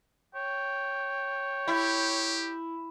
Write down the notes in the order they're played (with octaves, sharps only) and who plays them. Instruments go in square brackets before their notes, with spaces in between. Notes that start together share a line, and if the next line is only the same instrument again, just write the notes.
[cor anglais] C#5 [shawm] G5
[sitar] E4 [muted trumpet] G4